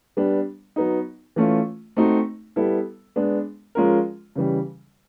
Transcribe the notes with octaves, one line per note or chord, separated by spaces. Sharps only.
G3 B3 D4
F#3 B3 D#4
E3 A3 C#4 F4
A3 C4 D#4 F#4
G3 B3 E4 A4
G#3 B3 D4
F3 G#3 C#4 F4 A#4
C#3 E3 G3